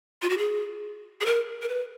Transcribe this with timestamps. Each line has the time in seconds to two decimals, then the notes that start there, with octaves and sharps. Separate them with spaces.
0.22 F4
0.30 F#4
0.38 G#4
1.21 G#4
1.26 A#4
1.62 A#4
1.69 B4